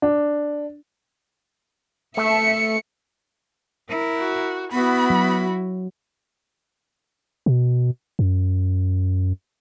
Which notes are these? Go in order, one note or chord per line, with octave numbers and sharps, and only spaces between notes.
D4
A3 E5 C#7
E4 A#4
F#4
B3 E4 F#4 B5
F#3
B2
F#2